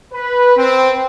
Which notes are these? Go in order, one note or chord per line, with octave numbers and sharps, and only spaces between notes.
B4
C4